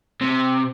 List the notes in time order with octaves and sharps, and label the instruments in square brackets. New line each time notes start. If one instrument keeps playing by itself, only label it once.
[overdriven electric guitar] C3